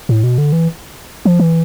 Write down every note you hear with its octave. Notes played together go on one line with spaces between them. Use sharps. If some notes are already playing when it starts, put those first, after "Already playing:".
A2
B2
D3
E3
F3
E3